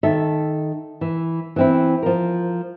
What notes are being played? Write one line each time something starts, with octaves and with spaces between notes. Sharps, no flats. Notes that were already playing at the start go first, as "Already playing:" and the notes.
D#3 A4 E5
E3
E3 C4 E4
F3 A#4